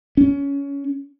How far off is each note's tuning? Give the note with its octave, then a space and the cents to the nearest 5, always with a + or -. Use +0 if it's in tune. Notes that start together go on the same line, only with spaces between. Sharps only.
C#4 +20